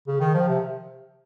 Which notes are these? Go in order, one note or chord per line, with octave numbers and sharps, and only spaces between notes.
C#3
D#3
F3
C3